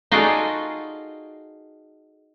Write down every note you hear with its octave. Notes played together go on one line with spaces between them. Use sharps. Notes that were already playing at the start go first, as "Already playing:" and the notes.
D#4 F4 F#4 G#4 A4 D5